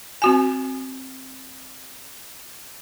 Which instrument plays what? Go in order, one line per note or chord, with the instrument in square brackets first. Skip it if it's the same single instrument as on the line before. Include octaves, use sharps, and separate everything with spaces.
[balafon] C4 F#4 G#5